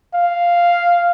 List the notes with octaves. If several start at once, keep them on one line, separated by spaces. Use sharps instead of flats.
F5